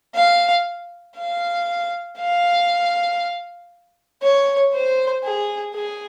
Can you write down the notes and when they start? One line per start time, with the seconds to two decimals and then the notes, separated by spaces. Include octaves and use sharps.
0.15 F5
1.17 F5
2.19 F5
4.22 C#5
4.73 C5
5.24 G#4
5.75 G#4